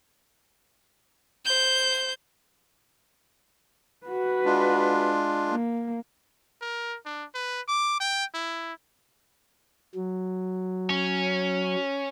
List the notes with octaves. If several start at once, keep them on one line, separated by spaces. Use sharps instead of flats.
C5 G6
F#4 B4
G#3 D4 F4
A#3
A#4
D4
B4
D6
G5
E4
F#3
C#4